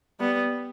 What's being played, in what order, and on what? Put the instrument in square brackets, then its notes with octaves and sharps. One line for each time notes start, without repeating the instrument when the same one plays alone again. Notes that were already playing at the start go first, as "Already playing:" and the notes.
[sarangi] G3 [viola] B3